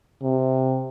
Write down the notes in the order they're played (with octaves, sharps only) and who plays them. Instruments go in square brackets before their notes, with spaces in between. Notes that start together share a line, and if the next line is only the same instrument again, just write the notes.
[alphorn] C3